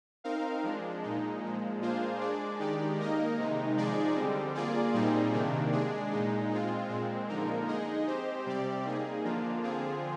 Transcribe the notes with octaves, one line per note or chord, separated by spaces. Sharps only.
C4 D#4 A#4 F5
F3 G#3 D4
A#2 G#3 D#4
A#2 F3 G#3
A#3 D4 F4 G#4 C5
G#3 D4 G#4 D5
D#3 G#3 D#4 G4 D5
A#3 D#4 A#4 D#5
C3 D#3 G#3 D#4
F3 G#3 D#4 G#4 D5
D3 G3 C4
A#3 F4 G#4 D5
A#2 G3 C4 D#4 G#4
C3 D#3 A#3 D4
G#3 D4 G#4
A#2 G#3 D#4
G#3 C4 F4
A#2 G#3 C4
D3 F3 A#3 D#4 A#4
G#3 D#4 G#4 D#5
C4 G4 C5
C3 G3 C4 G4 D5
A#3 D#4 G#4
D3 F3 A#3 D4 F4
D3 F3 C4 F4 G#4